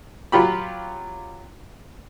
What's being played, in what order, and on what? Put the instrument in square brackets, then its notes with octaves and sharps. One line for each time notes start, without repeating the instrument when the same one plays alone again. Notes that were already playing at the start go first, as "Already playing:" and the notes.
[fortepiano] F#3 F4 G4 B5